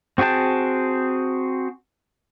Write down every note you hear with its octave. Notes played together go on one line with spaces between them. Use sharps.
C4 F#4 G#4 G5 A5